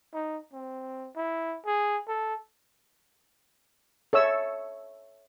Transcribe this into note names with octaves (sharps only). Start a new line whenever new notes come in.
D#4
C4
E4
G#4
A4
A4 C#5 E5 E6